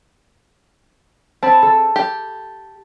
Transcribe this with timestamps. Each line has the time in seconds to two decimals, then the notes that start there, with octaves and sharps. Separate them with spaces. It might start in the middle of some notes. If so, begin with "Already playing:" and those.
1.43 C4 A5 B5
1.62 A4
1.96 G4